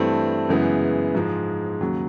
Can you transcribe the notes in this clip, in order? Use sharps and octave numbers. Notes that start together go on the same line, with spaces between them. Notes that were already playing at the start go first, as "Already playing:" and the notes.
Already playing: G2 E3 A3 C4
F#2 C#3 E3 G#3 B3
G#2 F3 G#3
D#2 C#3 F#3